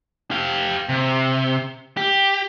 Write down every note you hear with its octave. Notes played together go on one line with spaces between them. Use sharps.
G4 F5
C3
G4